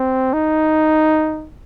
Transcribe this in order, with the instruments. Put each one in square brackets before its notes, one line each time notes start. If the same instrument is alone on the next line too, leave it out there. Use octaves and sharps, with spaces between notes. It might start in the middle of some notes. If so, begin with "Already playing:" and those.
Already playing: [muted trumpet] C4
D#4